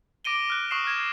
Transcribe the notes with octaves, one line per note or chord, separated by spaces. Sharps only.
D6 A#6 D7 D#7 G7
F6 F#6
C#6 D#6 C7 E7
F6 G#6 E7